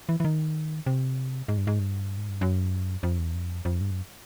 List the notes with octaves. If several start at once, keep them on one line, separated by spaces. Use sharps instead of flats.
E3
E3
D#3
C3
G#2
G2
G#2
G2
G#2
G2
F#2
F2
E2
F2
F2
G2
F#2